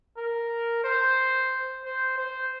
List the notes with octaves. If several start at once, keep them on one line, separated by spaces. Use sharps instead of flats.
A#4
C5
C5
C5